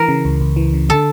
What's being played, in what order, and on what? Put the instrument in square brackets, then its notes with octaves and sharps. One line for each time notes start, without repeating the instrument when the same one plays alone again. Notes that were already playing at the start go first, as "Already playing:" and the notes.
Already playing: [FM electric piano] E3 [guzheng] A#4
[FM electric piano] C#3
C#2
C#2
E3
C#3
[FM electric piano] D3 [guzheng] A4